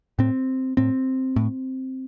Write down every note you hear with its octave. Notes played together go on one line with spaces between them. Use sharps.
A2 C4
A2 C4
A2